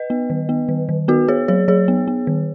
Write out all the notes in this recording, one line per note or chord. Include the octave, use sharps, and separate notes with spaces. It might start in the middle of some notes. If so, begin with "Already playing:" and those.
Already playing: B4 D#5
B3
D#3
B3
D#3
D#3
B3 F#4 B4
B3 G#4 C#5
F#3 G#4 C#5
F#3 G#4 C#5
B3
B3
D#3